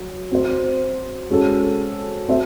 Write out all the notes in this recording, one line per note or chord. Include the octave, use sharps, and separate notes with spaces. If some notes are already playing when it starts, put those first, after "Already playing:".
Already playing: F#3
C4 F#4 C5
G#3 C#4 F#4 A4
C4 F#4 A4 C5 E5